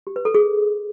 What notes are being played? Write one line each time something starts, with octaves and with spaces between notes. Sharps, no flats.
G4
B4
A4
G#4